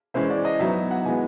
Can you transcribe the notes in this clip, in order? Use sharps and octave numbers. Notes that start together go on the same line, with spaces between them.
E3 G#3 C#4 E4 C5
D5
D#5
F#3 B3 D#4 E5
F#5
E3 G#3 B3 G#5